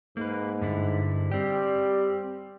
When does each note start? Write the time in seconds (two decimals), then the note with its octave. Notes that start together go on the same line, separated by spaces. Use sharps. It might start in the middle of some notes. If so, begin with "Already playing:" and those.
0.17 G#2 A#3 B4
0.61 G2 D3 E4
1.32 G3 C4 G4